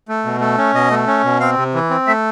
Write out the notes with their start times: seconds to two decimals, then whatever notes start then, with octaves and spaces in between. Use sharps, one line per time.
0.08 A3
0.25 B2
0.41 A3
0.58 C#4
0.74 B2 D#5
0.91 A3
1.07 C#4
1.24 B2
1.40 C4 F5
1.57 C3
1.74 E3
1.90 C4
2.07 A3 E5